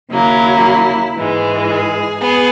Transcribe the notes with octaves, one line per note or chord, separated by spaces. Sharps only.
D#2 C#3 F#3 A#3 E4
G#2 E3 G#3
G#4
B3 G#4